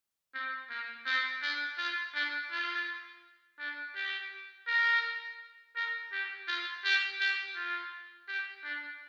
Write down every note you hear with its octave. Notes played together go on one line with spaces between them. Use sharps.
C4
A#3
C4
D4
F4
D4
F4
D4
G4
A#4
A#4
G4
F4
G4
G4
F4
G4
D4